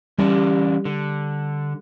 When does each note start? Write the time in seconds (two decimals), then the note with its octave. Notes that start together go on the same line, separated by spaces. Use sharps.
0.19 E3 G3 C#4 D5
0.85 D3